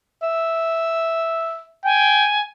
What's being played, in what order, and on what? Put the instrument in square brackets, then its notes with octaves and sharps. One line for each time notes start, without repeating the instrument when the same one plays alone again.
[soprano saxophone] E5
[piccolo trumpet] G5 [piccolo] G#5